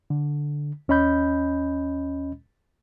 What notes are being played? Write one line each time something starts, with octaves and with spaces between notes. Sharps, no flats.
D3
D#2 C#4 D#5 B5 G6